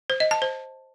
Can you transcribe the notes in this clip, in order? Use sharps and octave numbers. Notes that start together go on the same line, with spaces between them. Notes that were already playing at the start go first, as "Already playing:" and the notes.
C5
D#5
A5
C5